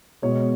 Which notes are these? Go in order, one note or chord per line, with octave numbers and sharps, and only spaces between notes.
B2 G#3 C#5